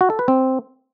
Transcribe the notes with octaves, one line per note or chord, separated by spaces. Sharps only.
F#4
A4
B4
C4